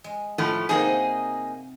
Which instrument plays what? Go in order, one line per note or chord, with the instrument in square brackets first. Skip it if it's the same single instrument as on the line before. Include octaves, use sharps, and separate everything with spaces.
[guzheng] G#3
[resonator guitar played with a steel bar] A2 F3 A3
[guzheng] C3 F#4 C5 [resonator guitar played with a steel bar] A#3 D#4 G#4